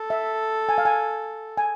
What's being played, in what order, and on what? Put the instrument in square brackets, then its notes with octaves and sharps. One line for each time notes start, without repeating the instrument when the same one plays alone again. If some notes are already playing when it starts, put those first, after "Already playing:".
Already playing: [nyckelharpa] A4
[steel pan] E5
G#5
F5
G#5
G#5